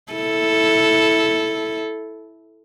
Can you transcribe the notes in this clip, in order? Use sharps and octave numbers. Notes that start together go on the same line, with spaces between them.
E4 A4